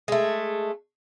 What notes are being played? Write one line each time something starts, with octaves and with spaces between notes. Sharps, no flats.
G#3 A3